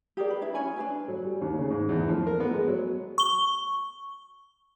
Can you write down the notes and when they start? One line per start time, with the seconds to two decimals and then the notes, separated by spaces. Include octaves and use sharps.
0.17 G4 G#4 A#4 D5
0.30 B4
0.41 D4 E4 E5
0.54 C#4 C#5 G#5 B5
0.76 D4 G#4 B4 G#5
1.08 F#3
1.23 G3
1.41 D#2
1.59 C#3
1.70 G#2
1.89 E2
2.08 F3
2.27 A#4
2.40 B3
2.54 G#3
2.68 F#3
3.18 C#6 G7